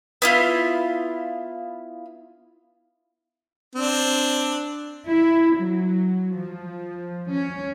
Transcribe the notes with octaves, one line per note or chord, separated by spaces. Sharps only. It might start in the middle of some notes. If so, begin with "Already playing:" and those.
B3 E4 F4
C4 D4
E4
F#3
F3
C#4